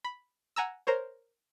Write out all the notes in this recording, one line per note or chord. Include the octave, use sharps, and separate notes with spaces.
B5
F#5 G#5 A#5 E6
A#4 C5 C#5